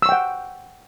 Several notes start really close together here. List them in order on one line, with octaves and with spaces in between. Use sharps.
E6 C#6 G5 F#5